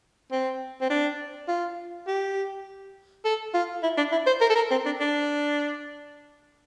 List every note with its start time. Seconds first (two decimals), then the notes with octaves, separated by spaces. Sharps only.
0.32 C4
0.81 C4
0.90 D4
1.48 F4
2.07 G4
3.25 A4
3.54 F4
3.83 E4
3.97 D4
4.12 E4
4.27 C5
4.41 A#4
4.50 A4
4.55 A#4
4.71 C4
4.86 D4
5.00 D4